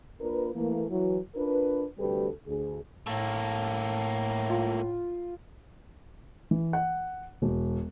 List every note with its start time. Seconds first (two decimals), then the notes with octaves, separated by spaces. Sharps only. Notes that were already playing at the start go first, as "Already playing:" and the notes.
0.20 A#3 D4 F4 A#4 B4
0.54 E3 A3 A#3
0.88 E3 F#3 F#4
1.35 D4 F4 A#4 B4
1.98 D2 C3 G3 G4 A4 B4
2.46 D2 G#4
3.07 A2 A3 A#3
4.50 F4
6.51 E3
6.73 F#5
7.42 E1